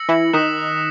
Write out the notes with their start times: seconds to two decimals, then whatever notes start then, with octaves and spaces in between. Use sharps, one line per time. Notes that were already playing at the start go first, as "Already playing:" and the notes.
Already playing: E6 A#6 C#7 F#7
0.09 E3 E4
0.33 D#3 D#4 D#6 F#6 B6 E7